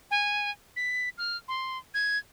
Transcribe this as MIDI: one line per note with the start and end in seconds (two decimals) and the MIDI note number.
0.11 0.51 80
0.76 1.09 95
1.18 1.37 89
1.48 1.78 84
1.94 2.18 92